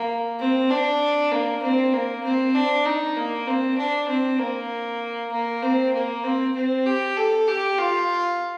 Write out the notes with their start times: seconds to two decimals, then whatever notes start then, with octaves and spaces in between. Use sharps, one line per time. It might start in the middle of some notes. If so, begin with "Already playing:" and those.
Already playing: A#3
0.39 C4
0.70 D4
1.31 A#3
1.62 C4
1.93 A#3
2.24 C4
2.54 D4
2.85 D#4
3.16 A#3
3.47 C4
3.77 D4
4.08 C4
4.39 A#3
5.32 A#3
5.62 C4
5.93 A#3
6.24 C4
6.55 C4
6.86 G4
7.17 A4
7.47 G4
7.78 F4